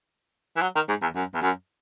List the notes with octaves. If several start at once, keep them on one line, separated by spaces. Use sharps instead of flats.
E3
F#3
D#3
G#2
E2
F#2
E2
F#2